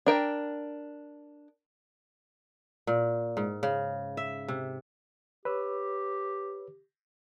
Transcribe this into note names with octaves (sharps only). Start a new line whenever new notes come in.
D4 A#4 G5
A#2
G#2
C#3
E5
C3
G4 B4 C#5 E6